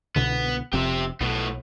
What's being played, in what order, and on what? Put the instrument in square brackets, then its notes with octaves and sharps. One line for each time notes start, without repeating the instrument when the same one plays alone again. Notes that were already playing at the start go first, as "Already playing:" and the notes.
[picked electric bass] C2 B2 D3 [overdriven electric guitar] B3
[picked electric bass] F1 F2 C3 [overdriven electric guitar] G4 E5
[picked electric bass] B1 [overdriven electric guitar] A2 B3